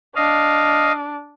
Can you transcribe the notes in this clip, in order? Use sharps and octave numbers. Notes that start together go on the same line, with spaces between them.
D4 D#5 F5